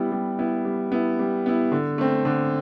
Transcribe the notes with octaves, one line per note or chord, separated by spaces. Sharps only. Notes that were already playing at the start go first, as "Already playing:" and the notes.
Already playing: G3 B3 E4
G3
B3 E4
G3
B3 E4
G3
B3 E4
D3
A3 C4
D3